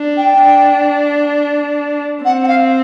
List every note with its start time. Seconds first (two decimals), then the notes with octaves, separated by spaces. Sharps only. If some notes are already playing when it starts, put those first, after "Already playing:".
Already playing: D4
0.17 G5
0.39 D4
2.24 C4 F#5
2.43 F#5
2.47 F5